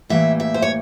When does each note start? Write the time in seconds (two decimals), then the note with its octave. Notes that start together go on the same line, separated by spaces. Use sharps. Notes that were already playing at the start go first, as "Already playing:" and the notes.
0.09 A2 E3 G3 A#3 E5
0.40 E5
0.54 C5
0.62 C#5